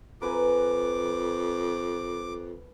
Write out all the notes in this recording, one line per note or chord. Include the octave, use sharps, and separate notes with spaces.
F2 A#4 B4 G#5 D6